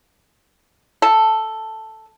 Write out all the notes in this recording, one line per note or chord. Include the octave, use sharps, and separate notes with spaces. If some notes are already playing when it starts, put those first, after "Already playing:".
A4